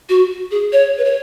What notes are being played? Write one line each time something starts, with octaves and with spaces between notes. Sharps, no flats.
F#4
G#4
C#5
B4
C#5